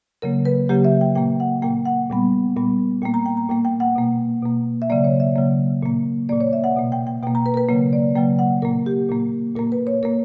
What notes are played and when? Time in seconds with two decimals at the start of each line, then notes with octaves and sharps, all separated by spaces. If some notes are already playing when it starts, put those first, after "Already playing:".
0.22 C#3 F#3 A#3 A#4
0.45 B4
0.69 C#3 F#3 A#3 G4
0.85 E5
1.01 G5
1.15 A#2 A#3 G5
1.40 F#5
1.62 A#2 A#3 G5
1.85 F#5
2.10 A#2 G3 B3
2.56 A#2 G3 B3
3.02 A#2 G5
3.05 A#3
3.14 A#5
3.26 G5
3.37 A#5
3.49 A#2 A#3 G5
3.65 G5
3.80 F#5
3.95 B2 A#3
4.42 B2 A#3
4.82 E5
4.90 C#3 F#3 A#3 D5
5.05 C#5
5.20 E5
5.36 C#3 F#3 A#3
5.83 A#2 A#3
6.29 A#2 A#3 D5
6.41 C#5
6.53 E5
6.64 F#5
6.76 B2 A#3
6.92 G5
7.07 G5
7.23 B2 G5
7.27 A#3
7.35 A#5
7.46 B4
7.54 A#4
7.57 B4
7.69 C#3 F#3 A#3
7.93 D5
8.16 C#3 F#3 A#3 G5
8.39 F#5
8.62 A#2 A#3 A#4
8.86 G4
9.09 A#2 A#3
9.55 A#2 A#4
9.59 A#3
9.72 B4
9.87 C#5
10.03 A#2 A#3 A#4